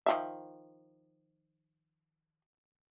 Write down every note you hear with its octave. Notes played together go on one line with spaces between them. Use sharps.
D#3 F3 E5